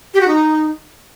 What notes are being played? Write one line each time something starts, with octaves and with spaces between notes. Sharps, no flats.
G4
F#4
D#4